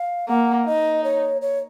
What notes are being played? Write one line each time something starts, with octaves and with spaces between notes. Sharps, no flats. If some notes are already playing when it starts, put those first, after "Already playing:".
Already playing: F5
A#3 F#5
D#4 D#5
C#5
C#5